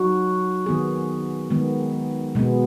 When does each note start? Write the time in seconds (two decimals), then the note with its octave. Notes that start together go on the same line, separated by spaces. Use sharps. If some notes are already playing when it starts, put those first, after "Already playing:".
Already playing: F#3 D#4 F#4
0.66 D#3 B3 G#4
1.51 D#3 G#3 B3
2.35 B2 G#3 B3